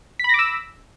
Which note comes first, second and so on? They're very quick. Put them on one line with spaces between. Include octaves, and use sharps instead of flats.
B6 B5 A#6 D6 E6